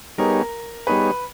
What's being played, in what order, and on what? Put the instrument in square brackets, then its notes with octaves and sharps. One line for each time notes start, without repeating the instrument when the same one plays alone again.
[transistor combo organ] G3 B3 D#4 G#4 C#5 [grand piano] A#4
[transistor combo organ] G3 B3 D#4 G#4 C#5 [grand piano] B4